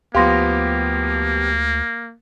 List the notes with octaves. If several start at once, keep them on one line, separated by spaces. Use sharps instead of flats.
D2 F3 A#3 B3 G4 F5 C6 A#6